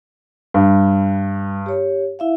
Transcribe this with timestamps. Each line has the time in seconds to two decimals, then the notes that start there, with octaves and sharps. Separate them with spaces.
0.54 G2 G3
1.66 G4 C#5
2.19 E4 E5 F5